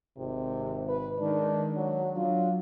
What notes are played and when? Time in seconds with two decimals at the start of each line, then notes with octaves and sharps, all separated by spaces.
0.17 G#1 C3
0.89 B4
1.20 D#3 G#3 D4
1.77 F#3
2.16 F#3 D4 F4